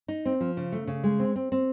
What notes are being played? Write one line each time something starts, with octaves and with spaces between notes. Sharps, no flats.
D#4
C4
F3
C#3
A3
C#3
G#3
C4
C4
C4